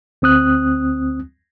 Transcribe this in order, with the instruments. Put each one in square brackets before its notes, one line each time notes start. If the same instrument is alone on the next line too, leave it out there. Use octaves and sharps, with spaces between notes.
[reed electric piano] D2 C4 D#6 F#6